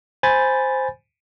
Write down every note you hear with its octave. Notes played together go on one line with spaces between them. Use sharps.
C5 G#5 B5 G6 A6